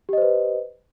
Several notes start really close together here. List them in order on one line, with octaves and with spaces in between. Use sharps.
G4 D#5 C5 B4